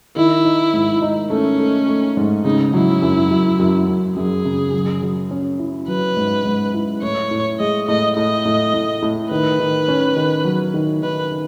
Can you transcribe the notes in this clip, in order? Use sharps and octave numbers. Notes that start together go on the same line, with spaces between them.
D#3 E4
D#4
G#2
D#4
A3 C#4
A3
A3
G#2
C#3 D#4
F#3 E4
F#2
F#2
F#2
F#2
F#2 G#4
C#3
F#3
F#3
C#4
E4
F#3 B4
G#2
G#2
E4
A2 C#5
A2
G#3 D#5
A2 D#5
A2 D#5
A2
A2
A2
D#3 B4
D#3
C#4
D#3
F#3
D#3
D#3 B4
D#3